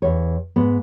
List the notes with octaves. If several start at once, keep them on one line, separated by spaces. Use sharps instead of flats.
E2 C#5
G#2 B3